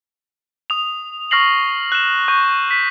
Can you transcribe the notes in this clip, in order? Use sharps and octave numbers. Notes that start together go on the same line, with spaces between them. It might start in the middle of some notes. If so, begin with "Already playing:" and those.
D#6 F7
C#6 F6 A#6 C7 F#7
F#6 E7
C#6 G6 D#7
B6